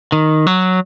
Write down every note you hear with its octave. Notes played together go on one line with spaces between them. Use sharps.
D#3
F#3